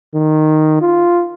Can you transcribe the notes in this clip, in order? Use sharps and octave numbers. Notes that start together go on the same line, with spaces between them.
D#3
F4